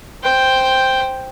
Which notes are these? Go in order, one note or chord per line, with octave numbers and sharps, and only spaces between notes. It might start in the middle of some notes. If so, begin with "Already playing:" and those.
C5 G5